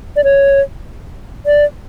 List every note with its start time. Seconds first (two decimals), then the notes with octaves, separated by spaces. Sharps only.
0.16 D5
0.24 C#5
1.46 D5